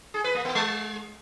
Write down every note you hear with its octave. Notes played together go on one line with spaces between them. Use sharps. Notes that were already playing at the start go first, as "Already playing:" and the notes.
G#4
B4
A#3
B3
G#3